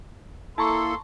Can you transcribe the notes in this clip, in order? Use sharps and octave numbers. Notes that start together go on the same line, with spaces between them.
A#3 E4 A4 A5 A#5 C6 C#6